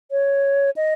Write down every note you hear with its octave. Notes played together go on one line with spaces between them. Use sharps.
C#5
D#5